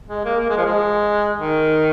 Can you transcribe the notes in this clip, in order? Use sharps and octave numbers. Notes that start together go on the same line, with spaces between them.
G#3
A#3
A#3
G#3
F3
G#3
D#3